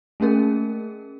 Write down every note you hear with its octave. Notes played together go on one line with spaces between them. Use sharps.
A3 A#3 C#4 G#4 A#4